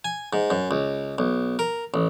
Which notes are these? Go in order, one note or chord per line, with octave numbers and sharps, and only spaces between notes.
G#5
G#2
F#2
C#2
B1
A#4
A1